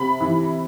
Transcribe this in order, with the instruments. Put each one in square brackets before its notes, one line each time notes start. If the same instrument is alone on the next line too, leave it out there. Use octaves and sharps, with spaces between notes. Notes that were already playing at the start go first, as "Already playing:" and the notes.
Already playing: [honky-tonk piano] C3 B5
E3